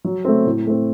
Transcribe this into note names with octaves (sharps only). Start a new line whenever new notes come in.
F#3
A3 C4
A2
A3 C4